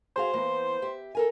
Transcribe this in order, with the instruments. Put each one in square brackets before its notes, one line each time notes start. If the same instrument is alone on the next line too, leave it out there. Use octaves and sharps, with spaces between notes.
[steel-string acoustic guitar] F#4 G#4 F5 [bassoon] C5
[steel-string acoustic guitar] E3 A#3 B3
G4 E5
A4 A#4 G#5